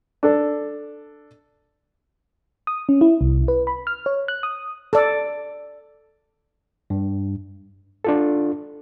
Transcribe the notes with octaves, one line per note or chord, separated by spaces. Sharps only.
D4 A4
D#6
C#4
E4
C2
B4
B5
F6
C#5
F#6
D#6
A4 D5
G2
D4 F4 A4